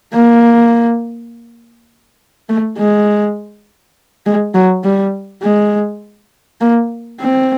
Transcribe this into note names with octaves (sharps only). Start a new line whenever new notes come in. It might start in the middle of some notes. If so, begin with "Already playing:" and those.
A#3
A3
G#3
G#3
F#3
G3
G#3
A#3
C4